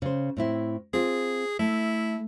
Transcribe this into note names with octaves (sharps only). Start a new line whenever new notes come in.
C#3 C5
A2 C4 E4
C4 F4 G#4
A3 E4